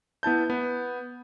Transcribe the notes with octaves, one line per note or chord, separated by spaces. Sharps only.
B3 E4 A5 G6
B3